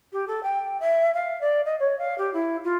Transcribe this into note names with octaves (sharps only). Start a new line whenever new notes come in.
G4
A4
G5
E5
F5
D5
D#5
C#5
F5
G4
E4
F4